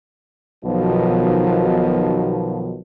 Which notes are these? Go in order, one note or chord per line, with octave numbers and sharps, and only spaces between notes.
B1 B2 D#3 F3